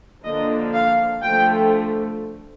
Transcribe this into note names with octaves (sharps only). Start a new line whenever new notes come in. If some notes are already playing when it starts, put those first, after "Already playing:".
D3 F3 A#3 D4 D#5
F5
D3 F3 A3 G5